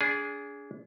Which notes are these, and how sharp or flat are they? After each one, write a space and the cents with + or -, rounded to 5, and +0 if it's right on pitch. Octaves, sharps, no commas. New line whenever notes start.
D4 -30 G#4 +0